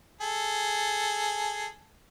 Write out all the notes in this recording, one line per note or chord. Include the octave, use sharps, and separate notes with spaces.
G#4 A4